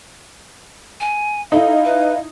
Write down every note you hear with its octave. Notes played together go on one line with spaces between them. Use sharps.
G#5
D#4 E4 A4 F5
B4